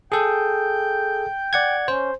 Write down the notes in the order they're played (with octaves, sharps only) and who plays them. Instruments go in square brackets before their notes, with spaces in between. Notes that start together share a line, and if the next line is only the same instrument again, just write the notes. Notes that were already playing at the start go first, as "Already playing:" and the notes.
[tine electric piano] G#4 A4 [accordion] G5 G6
[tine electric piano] D5 F#5 G#6
[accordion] C#4 [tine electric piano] C5